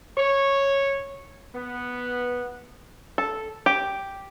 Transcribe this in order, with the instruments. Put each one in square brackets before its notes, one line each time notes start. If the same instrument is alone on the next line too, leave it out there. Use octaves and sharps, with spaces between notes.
[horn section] C#5
B3
[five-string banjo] A4
G4